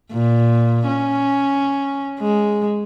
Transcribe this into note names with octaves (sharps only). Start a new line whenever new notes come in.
A#2
C#4
G#3